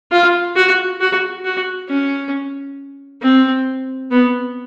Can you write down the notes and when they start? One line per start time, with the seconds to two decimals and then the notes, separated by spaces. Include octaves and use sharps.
0.11 F4
0.56 F#4
1.01 F#4
1.45 F#4
1.89 C#4
3.23 C4
4.11 B3